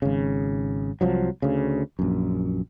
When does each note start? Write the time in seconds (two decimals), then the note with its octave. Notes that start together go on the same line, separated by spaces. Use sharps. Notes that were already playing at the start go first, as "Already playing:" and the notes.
0.02 G#1 C#3
1.01 C2 F3 F#3
1.42 D2 C#3
1.99 A#1 F#2